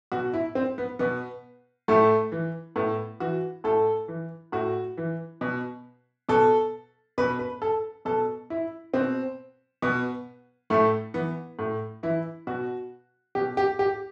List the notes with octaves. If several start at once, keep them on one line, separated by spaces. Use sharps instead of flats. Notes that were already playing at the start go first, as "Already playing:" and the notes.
B2 F#4
E4
C4
B3
B2 B3
A2 A3
E3
A2 B3
E3 F#4
A2 A4
E3
A2 F#4
E3
B2
B2 A4
B2 B4
B4
A4
B2 A4
E4
B2 C4
B2 B3
A2 A3
E3 B3
A2
E3 E4
B2 F#4
B2 G4
G4
G4